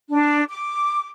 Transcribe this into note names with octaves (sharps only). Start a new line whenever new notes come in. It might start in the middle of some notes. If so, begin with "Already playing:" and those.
D4
D6